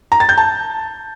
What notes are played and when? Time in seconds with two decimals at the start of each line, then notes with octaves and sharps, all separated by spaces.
0.12 A#5
0.20 A6
0.29 G6
0.37 A5